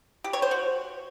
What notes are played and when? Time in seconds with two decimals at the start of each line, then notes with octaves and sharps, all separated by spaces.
0.24 G4
0.33 C#5
0.42 C5
0.51 F#4